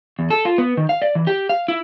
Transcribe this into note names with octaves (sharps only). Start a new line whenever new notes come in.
E2
A4
F4
B3
D#3
F5
D5
E3
G4
F5
E4